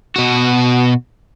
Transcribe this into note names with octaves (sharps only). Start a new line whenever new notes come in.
B2 F#4